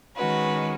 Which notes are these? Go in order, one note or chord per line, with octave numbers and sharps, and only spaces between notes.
D#3 G#3 C#4 F#4 B4